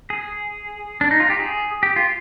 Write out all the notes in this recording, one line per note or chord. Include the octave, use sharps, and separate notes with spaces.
G#4
D4
D#4
F4
G4
G#4
G4
F4